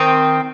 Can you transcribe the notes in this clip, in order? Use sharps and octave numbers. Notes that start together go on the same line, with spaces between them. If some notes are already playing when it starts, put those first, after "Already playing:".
Already playing: D#3 C4 D#4